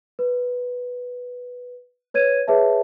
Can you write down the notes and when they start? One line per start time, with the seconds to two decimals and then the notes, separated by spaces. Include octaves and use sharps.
0.19 B4
2.14 B4 C#5 G#6 D#7
2.48 G#4 B4 C#5 E5 A5